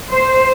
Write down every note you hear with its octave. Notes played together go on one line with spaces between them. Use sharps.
C5